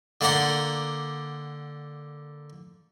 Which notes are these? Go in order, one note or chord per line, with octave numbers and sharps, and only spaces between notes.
D3 A#3 D5 F#5 A#5 C6